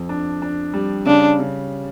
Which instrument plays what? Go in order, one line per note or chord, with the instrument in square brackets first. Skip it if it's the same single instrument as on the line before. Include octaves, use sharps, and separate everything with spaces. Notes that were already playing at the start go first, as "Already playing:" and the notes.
Already playing: [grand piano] F2
D4
D4
G3
[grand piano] C#3 [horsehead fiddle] D4
[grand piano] C#3